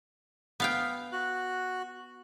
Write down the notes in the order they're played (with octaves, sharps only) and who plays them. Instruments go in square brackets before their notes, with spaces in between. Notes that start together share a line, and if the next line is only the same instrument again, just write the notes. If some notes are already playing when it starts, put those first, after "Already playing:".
[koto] B3 F5 G5
[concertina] F#4 F#6